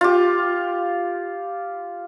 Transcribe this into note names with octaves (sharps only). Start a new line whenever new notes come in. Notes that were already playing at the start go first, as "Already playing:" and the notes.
F4 G4